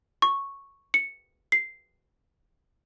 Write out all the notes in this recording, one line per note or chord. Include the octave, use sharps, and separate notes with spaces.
C#6
C#7
C7